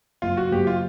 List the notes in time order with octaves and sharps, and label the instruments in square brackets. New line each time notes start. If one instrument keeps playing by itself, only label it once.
[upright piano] F#1 [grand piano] F4
[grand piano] F#4
[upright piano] F#1 [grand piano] G4
[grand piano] F4